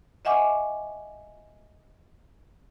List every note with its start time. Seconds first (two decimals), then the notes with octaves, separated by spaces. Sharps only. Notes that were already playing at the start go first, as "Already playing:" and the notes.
0.25 D#5 E5 F#5 G#5 C#6 D6